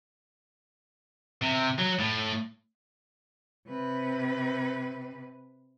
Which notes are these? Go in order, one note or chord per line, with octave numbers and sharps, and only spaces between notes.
C3
F#3
A2
C3 B4